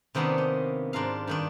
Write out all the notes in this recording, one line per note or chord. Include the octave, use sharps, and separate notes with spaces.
C3 D#3 A#3 B3 C#4 D4
D#4
G#2 D4 F4 A#4 F5
G2 D#3 D4